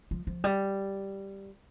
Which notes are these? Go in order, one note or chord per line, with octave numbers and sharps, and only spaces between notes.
F3
F3
G3